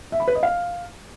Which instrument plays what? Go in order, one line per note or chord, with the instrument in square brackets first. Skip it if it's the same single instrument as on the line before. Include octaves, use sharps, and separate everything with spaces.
[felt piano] E5
B5
B4
D#5
F5